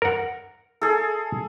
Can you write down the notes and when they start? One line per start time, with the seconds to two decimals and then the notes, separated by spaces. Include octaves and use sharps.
0.02 A#4 F#5
0.81 G#4 A4